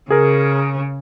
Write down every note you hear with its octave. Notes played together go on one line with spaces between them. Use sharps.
C#3 G#4 A#4